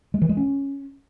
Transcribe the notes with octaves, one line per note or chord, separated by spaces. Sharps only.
G#3
E3
G#3
C#4